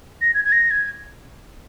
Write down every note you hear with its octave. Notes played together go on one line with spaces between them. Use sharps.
A#6
G#6
G#6
A#6
G#6